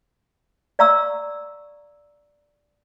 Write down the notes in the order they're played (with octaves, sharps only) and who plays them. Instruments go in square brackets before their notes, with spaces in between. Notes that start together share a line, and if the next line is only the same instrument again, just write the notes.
[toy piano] D5 F5 A#5 C#6 E6